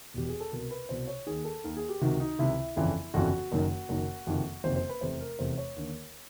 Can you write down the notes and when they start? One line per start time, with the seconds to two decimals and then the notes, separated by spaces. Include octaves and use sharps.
0.14 E1 E2 B2 G4
0.29 G#4
0.40 A4
0.52 C2 B2 A#4
0.71 B4
0.89 C2 B2 C5
1.08 C#5
1.26 D#2 D#3 G#4
1.45 A4
1.64 D#2 D#3 A#4
1.77 G#4
1.89 G4
2.01 C#2 C3 D#3 F#4
2.20 D#4
2.39 C#2 C3 D#3 E4
2.76 G1 F2 C#3 E3
3.14 G1 F2 C#3 E3 F#4
3.52 F#1 F#2 D#3
3.89 F#1 F#2 D#3
4.27 F#1 F2 C3 D#3
4.64 F#1 F2 C3 D#3 C5
4.76 C5
4.89 B4
5.01 F1 E2 C3 C5
5.20 A#4
5.39 F1 E2 C3 C5
5.58 C#5
5.76 D#2 D3